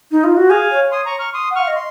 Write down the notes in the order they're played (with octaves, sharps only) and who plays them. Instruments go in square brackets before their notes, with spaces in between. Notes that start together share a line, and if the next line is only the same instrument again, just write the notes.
[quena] D#4
F4
F#4
[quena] G#4 [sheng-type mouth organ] F5 G#5
[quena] C#5
[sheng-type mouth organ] C6 D#6
A#5 C#6
C#6 F6
C6 D#6
[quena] F#5
[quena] F5 [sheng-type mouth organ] C#6 F6
[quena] D#5
[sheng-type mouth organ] C6